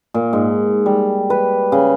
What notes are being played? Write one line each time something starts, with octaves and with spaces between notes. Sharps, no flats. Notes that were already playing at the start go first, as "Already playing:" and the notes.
A#2
G#2
G3
B4
C#3